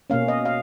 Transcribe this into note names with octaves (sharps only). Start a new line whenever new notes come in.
B2 A#3 C#4 F5
D#5
F5